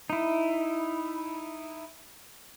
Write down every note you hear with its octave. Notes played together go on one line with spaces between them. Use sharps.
D#4 E4